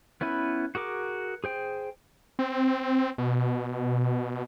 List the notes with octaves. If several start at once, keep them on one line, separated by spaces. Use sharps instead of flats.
B3 C#4 E4 B4
F#4 G#4 A#4 D6
G#4 C5 G5
C4
B2